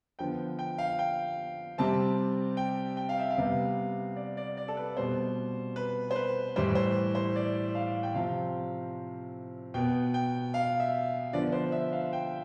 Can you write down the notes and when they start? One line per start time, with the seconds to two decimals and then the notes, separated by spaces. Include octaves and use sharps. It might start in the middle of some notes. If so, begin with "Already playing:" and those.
0.19 D3 F3 B3 G5
0.59 G5
0.78 F5
0.99 G5
1.78 C3 G3 C4 A5
2.57 G5
2.97 G5
3.09 F5
3.19 E5
3.30 F5
3.38 C3 G3 B3
4.16 D5
4.37 D5
4.57 D5
4.68 A4
4.77 B4
4.96 B2 G3 C4 C5
5.76 B4
6.11 C5
6.16 B4
6.56 A2 E3 G3 C5
6.75 C5
7.15 C5
7.36 D5
7.75 F5
8.03 G5
8.14 C3 F3 C4 F5
9.74 B2 B3 G5
10.14 G5
10.54 F5
10.80 E5
11.33 D3 F3 B3 D5
11.52 C5
11.72 E5
11.92 F5
12.13 G5